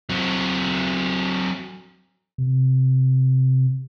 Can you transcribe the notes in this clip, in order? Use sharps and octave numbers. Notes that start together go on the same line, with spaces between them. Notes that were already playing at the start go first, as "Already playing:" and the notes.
F#3 C4
C3